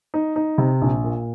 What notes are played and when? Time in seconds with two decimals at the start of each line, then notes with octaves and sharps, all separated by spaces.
0.14 D#4
0.36 D#4
0.58 C3
0.82 A#1
1.04 A#2